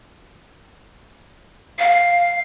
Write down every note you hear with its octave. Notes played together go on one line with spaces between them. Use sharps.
F5